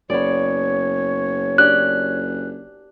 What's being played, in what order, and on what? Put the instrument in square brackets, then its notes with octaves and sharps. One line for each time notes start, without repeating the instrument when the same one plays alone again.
[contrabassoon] F#1 [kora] B3 D5 [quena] C#5
[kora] D4 G4 [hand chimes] F#6